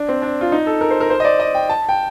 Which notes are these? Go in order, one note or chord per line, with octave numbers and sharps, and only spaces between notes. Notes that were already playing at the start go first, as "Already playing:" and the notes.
Already playing: D4
C4
D4
F4
D#4
A4
A#4
C5
A#4
C5
D#5
D5
D#5
G5
A5
G5